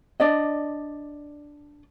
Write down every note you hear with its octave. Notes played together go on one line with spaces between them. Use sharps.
D4 D5 D#5